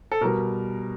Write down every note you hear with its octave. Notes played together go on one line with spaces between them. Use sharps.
A4
B2 G3 A#4